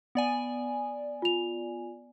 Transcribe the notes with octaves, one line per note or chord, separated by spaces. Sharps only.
B3 D5 G#5
F4 F7